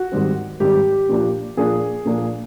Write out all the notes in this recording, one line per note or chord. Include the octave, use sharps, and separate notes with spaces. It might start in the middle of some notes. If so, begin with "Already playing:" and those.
Already playing: F#4
G#2 D#3 G3 C4
G#2 D#3 G3 C4 G4
A#2 F3 A#3 D4
A#2 F3 A#3 D4 G#4
A#2 F3 A#3 D4